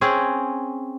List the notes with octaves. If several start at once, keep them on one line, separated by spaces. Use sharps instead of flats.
C4 C#4 G#4